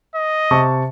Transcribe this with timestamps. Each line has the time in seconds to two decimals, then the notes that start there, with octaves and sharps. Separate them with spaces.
0.15 D#5
0.51 C3 A5 C#6